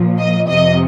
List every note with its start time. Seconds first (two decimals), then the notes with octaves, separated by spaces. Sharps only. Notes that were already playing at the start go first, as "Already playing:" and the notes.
Already playing: A#2 F3
0.19 D#5
0.48 F2 C3 F3 D#5